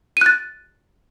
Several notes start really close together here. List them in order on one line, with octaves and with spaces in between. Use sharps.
D#7 F#6 A6